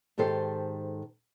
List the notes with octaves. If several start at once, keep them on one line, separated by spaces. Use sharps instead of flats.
G#2 D#3 G4 A4 C5